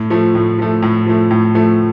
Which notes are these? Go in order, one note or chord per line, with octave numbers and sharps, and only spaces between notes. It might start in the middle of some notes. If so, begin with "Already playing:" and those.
Already playing: A2
F3 A3
A2
F3 A3
A2
F3 A3
A2
F3 A3